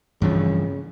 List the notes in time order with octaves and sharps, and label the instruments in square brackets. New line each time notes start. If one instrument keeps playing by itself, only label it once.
[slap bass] G2 E3 F3 [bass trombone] C#3